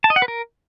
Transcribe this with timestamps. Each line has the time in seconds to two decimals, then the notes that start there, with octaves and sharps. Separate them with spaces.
0.04 A5
0.10 D#5
0.16 F#5
0.22 B4
0.28 A#4